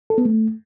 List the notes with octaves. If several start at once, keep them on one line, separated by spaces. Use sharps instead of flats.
A4
B3
A3